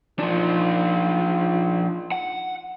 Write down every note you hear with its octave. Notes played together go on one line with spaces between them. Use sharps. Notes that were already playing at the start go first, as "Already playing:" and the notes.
F3 D4 D#4 F4
F#5